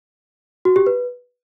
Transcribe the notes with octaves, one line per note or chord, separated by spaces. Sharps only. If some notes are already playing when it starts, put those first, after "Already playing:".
F#4
G4
B4